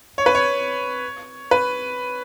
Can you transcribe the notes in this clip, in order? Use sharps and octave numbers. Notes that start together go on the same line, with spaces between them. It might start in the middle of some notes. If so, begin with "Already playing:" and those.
C#5
B4
C#5
B4